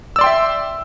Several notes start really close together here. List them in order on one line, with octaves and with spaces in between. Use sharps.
E6 D5 C6 G5 E5